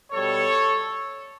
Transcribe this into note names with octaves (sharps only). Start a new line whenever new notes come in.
B2 G3 A4 C#5